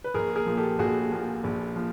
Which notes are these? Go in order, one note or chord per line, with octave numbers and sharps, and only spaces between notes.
B4
A#1 G#4 A#4
G#4 A#4
A#2 F3
G4 A4
A#1 F#4 G#4
A#2 F3
A#1
F3